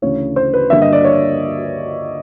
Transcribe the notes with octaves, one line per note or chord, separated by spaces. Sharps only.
D2 C#3 E3 A3 C#5
C5
B4
G2 D3 G3 A#3 E5
D#5
D5
C#5